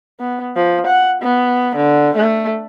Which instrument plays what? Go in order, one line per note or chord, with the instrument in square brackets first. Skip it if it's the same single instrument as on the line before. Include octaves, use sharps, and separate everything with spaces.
[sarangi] B3
F3
F#5
B3
D3
A3